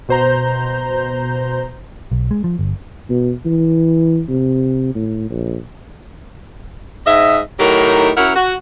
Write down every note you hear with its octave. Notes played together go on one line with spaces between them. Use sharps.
B2 C5 A#5 G6
B1
G#3
F3
G1
B2
E3
C3
A2
A#1
G#2 D#5 E5
A2 D#3 F#3 D#4 G4 A#4
F#2 E4 A#4 C#5 F#5
F#4